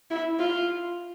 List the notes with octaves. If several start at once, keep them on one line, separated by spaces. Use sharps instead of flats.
E4
F4